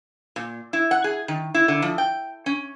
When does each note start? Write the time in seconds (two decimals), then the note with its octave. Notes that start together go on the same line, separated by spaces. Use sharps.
0.36 A#2
0.73 E4
0.91 F#5
1.04 G#4
1.28 D#3
1.54 E4
1.68 D3
1.82 F3
1.98 G5
2.46 C#4